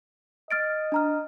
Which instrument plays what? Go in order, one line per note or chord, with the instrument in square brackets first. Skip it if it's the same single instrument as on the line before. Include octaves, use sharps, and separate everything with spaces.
[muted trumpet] D#5 [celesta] F6 A6 D7
[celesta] D4 A#5 F6